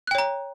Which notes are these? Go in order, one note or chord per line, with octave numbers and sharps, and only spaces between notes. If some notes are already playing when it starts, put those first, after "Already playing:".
C#5 G5 A#5 F#6